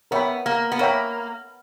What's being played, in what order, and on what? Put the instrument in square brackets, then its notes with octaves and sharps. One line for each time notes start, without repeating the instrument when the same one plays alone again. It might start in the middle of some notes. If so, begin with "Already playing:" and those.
[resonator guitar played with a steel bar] B3 [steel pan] A#4 C#5 E5 G5 B5
[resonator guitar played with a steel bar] A#3
B3
[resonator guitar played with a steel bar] A#3 [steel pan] A#4 C#5 E5 G5 B5